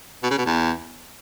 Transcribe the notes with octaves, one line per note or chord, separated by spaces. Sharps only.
B2
C#3
B2
E2